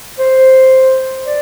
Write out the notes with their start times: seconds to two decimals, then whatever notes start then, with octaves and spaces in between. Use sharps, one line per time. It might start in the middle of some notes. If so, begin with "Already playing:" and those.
0.19 C5
1.26 D5